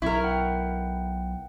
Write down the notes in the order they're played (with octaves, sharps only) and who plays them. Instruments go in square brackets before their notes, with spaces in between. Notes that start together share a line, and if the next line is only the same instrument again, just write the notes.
[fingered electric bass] B1 [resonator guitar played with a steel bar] E4 A#4 [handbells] C#6
[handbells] F#5 G5